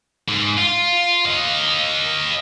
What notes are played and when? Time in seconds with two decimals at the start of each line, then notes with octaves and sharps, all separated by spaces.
0.28 G#2
0.57 F4
1.25 D#5 F5